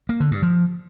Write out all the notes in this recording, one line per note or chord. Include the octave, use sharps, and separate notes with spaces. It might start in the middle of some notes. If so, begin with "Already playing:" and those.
A#3
D3
G2
F3